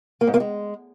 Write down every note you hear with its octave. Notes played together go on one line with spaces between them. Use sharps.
A#3
G#2
A#3
G#3